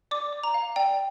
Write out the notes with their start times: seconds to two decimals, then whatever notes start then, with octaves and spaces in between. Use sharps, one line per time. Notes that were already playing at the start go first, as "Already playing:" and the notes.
0.11 D5 D6
0.33 D5
0.44 A#5
0.54 F5
0.76 D5 G5